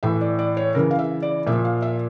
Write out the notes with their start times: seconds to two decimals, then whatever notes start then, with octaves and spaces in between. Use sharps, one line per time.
0.03 A2 E3 E5
0.21 D5
0.39 D5
0.57 C#5
0.75 C#3 E3 A#4
0.91 F5
0.99 E5
1.22 D5
1.47 A#2 F3 E5
1.65 F5
1.82 E5